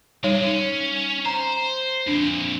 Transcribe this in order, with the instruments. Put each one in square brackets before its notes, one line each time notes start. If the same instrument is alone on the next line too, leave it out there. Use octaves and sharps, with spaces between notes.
[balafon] G3 D#4 C#5 [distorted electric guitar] G#3 D4
[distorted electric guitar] C#4
[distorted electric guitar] C5 [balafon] A#5
[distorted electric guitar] F2 A#2 [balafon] D4